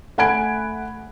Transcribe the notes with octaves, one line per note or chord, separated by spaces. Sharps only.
A3 F#5 G#5 B5 G#6 D7